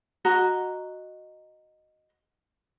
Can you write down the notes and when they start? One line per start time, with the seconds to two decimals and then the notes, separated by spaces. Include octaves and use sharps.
0.25 F#4 D#5 A#5